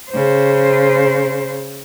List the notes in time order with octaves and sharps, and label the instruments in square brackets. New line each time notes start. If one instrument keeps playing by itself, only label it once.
[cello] C#3 C5